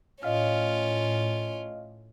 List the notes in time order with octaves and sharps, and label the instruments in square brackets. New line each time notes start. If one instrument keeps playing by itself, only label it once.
[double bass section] A2 [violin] C#4 F4 [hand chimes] D#5 F5 F6